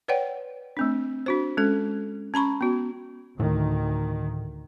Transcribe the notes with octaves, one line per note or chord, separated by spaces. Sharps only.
B4 C#5 D5 F#5 G5
A3 C4 D4
D4 F#4 C5
G#3 C#4 A4
C#4 A#5 B5 C#6
B3 F#4
D2 A2 D#3